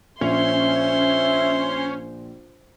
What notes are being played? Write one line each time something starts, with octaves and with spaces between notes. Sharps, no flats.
A#1 C#4 C5 E5 C6 F7